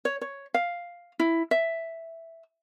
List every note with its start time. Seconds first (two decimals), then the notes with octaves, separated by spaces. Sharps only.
0.05 C#5
0.21 C#5
0.54 F5
1.19 E4
1.51 E5